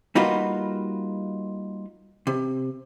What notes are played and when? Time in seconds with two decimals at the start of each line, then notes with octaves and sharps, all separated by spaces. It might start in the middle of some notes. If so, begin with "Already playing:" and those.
0.15 G3 A#3 D#4 F4 F#4 B4
2.27 C3